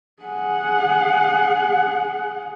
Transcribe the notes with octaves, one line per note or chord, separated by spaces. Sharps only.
G#4 F#5